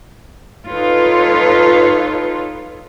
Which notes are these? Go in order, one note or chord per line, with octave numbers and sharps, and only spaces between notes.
D#4 F4 A4 B4 C#5